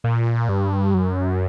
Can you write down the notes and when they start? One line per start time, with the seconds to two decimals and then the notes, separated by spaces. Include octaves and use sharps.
0.04 A#2
0.49 G2
0.94 F#2